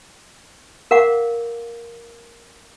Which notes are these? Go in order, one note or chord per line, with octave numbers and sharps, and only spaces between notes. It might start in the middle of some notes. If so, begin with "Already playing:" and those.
A#4 F5 F#5 D6